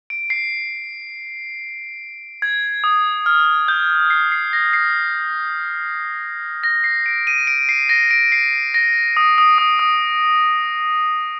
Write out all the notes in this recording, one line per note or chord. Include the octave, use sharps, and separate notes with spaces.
D7
C7
G#6
D#6
F6
G6
C7
C7
A#6
C7
A#6
C7
D7
D#7
D7
C7
A#6
D7
C7
A#6
D#6
D#6
D#6
D#6